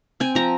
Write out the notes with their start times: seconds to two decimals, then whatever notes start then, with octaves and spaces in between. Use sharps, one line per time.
0.20 C4 G#5
0.35 F3 A#5